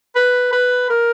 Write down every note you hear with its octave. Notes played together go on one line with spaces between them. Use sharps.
B4
B4
A#4